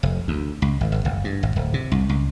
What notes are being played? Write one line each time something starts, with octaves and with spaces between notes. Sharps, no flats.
F1
D2
C#2
G#1
G#1
F#1
G2
G#1
D1
C3
C2
C#2